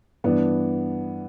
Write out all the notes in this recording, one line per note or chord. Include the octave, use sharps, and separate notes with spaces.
G2 E3 B3 D4